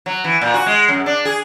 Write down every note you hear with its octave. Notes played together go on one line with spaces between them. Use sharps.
F#3
E3
A#2
F#4
G#3
F#2
D4
G#4